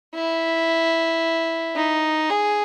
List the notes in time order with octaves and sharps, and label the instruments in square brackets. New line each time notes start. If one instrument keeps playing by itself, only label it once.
[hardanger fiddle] E4
D#4
G#4